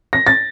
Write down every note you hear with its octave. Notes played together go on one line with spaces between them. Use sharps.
A#6
A6